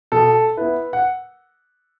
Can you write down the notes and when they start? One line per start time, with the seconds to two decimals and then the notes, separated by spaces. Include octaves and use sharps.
0.12 B2 A4
0.57 B3 E4 B4
0.93 F#5